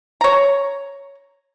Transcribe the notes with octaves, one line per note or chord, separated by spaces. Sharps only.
C#5 A#5